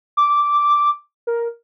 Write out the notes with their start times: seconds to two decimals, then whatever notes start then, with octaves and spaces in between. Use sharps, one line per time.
0.17 D6
1.27 A#4